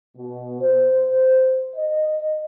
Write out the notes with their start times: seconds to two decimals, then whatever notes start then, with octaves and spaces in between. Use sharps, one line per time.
0.16 B2
0.61 C5
1.75 D#5